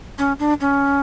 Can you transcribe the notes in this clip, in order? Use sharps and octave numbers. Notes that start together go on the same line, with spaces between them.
C#4
D4
C#4